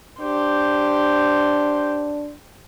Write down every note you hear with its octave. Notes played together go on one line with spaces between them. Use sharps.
D4 G4 C5